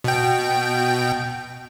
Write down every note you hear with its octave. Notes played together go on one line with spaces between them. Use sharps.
B2 G5